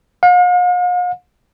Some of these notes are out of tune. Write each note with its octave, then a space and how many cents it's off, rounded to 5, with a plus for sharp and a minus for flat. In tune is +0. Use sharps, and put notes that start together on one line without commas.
F5 +45